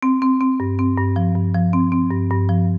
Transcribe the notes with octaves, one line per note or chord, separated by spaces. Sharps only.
C4
C4
C4
G2
C4
G2
F3
G2
F3
C4
C4
G2
G2
F3